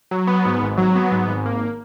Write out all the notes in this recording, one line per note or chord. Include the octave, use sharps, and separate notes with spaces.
F#3
B3
G#2
G#1
F#3
B3
G#2
G#1
A#3